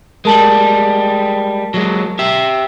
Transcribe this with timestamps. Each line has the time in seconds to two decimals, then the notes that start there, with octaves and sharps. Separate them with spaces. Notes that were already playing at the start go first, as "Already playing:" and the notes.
0.25 G3 G#3 A#4 A5 F#7
1.74 F#3 G#3
2.19 G4 E5